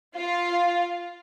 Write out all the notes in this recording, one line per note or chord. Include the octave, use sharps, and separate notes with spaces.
F4